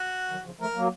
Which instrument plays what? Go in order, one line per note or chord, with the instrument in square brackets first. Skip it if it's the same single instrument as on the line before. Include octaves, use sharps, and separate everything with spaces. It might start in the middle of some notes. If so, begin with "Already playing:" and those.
Already playing: [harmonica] F#4
[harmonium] D#3 F#3
C#3 F3
[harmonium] F3 A3 [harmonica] A#4
[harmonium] F#3 A#3